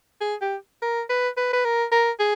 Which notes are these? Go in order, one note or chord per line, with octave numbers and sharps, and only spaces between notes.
G#4
G4
A#4
B4
B4
B4
A#4
A#4
G#4